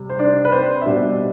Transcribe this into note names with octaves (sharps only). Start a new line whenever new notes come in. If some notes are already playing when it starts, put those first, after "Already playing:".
Already playing: C3 G3
C5
D4 D5
B4
C4 C5
E5
B2 G3 D4 D5